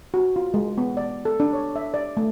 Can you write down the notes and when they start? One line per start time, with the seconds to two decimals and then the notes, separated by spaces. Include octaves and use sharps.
0.14 F#4
0.36 F4
0.54 G#3
0.78 B3
0.97 D5
1.25 A4
1.40 D4
1.53 C#5
1.76 E5
1.94 D5
2.17 A3